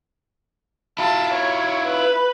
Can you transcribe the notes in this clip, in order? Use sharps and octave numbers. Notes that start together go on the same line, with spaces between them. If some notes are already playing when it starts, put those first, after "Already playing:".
E4 F4 A5
C#5
B4 B5